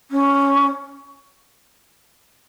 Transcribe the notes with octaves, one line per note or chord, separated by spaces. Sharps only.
C#4